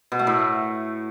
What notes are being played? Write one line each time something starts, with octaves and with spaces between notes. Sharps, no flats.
B2
A3
A2